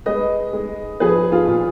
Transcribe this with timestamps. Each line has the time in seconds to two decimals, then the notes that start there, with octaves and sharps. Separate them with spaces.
0.06 G#3 B4 D#5
0.53 G#3
1.00 F3 G#4 B4
1.32 F4 G#4
1.48 A#2